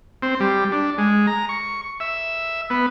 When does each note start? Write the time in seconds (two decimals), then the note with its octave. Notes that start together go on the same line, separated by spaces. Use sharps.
0.23 C4
0.40 G3
0.72 D4
0.98 G#3
1.27 A#5
1.49 C#6
2.00 E5
2.70 B3